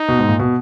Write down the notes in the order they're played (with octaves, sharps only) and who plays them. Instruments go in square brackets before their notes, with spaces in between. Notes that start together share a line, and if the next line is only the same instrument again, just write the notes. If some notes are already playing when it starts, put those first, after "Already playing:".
Already playing: [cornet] D#4
[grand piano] B2
G#2
A#2
B2